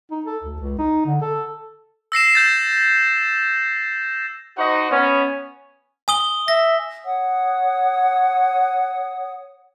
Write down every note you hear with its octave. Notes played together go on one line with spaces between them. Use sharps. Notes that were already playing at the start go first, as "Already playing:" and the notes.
D#4
A4
D2
C#2
D#4
D3
A4
E6 A#6 C7 E7
G6 A6 C7
D#4 F#4 C5 D#5 F#5
B3 C#4
G#5 D#6 G7
E5 A#6
C#5 F#5 D#6